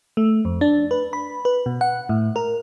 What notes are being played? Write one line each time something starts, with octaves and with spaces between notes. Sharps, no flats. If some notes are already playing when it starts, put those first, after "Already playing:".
A3
F2
D4
B4
B5
B4
B2
F#5
A2
A#4